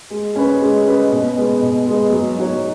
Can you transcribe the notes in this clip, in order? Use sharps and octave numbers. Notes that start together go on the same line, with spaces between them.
G#3
C#4 B4 D#5
G#3
C#4 B4 D#5
B2
G#3 B3
B2
G#3 B3
F#3
D#4 F#4 C#5